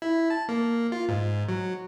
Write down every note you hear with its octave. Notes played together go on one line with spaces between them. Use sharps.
E4
A5
A#3
F4
G#2
F#3